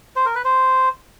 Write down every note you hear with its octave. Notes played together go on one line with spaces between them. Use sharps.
C5
A#4
B4
C5